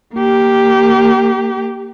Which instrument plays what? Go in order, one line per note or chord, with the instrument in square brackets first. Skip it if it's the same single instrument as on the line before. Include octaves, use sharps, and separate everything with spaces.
[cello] A#3 G4